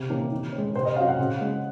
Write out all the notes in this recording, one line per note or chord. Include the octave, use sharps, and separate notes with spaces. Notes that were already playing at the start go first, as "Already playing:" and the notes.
Already playing: C3
D#3 A#3 C#4
D#3
C#4
G#3
C3 C5
D#5
F#3 C#4 F5
F#5
C#3
G#3 C#4